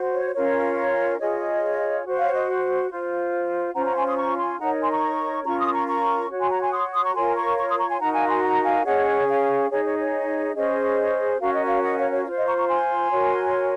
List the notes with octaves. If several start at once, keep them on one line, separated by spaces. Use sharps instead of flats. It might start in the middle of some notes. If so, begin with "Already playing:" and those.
Already playing: F#4 C5
C#5
C#4 F4 A#4 C#5
F4 G#4 C#5 D#5
F#4 C5
C#5 F5
D#5
F4 C5
C#4 F4 C5 F#5 A#5
F#5 A#5
G#5 C6
C6 D#6
A#5 C#6
G#5 C6
D#4 A#4 C#5 F#5 A#5
G#5 C6
A#5 C#6
C#4 F4 A#4 A#5 C#6
C6 D#6
A#5 C#6
A#5 C#6
F#4 C#5
G#5 C6
F#5 A#5
G#5 C6
C6 D#6
C6 D#6
A#5 C#6
F4 A#4 C#5 G#5 C6
A#5 C#6
A#5 C#6
C6 D#6
A#5 C#6
G#5 C6
D#4 F#4 A#4 F#5 A#5
F5 G#5
G#5 C6
F#5 A#5
F5 G#5
C#4 G#4 C#5 D#5 F#5
C#5 F5
D#4 G#4 C#5
C#5
C#5
C#4 G#4 C5 D#5
C#4 F#4 A#4 F5
D#5
C#5 F5
D#5 F#5
C#5 F5
C#5 F5
F4 C5 C#5
D#5
A#5 C#6
A#5 C#6
G#5 C6
F#4 A#4 C#5